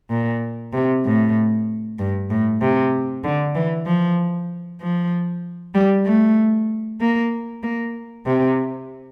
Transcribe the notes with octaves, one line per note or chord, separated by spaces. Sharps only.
A#2
C3
A2
G2
A2
C3
D3
E3
F3
F3
G3
A3
A#3
A#3
C3